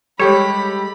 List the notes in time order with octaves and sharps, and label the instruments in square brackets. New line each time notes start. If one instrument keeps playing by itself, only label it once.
[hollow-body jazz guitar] G3 G#3 [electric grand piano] G4 A4 [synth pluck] C#5 [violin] B5